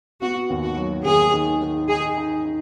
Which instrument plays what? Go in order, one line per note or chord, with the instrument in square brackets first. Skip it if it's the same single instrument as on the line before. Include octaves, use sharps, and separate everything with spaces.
[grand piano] B3 [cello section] F#4
[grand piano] D#2
[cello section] F#4
[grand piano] F#3
[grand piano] D#2 [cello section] G#4
[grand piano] D#3
D#3
[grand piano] D#4 [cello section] G#4
[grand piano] D#4
D#4